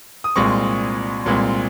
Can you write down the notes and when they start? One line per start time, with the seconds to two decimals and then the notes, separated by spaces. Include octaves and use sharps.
0.24 D#6
0.36 C2 A#2 G#3 C4 C#6
1.26 C2 A#2 G#3 C4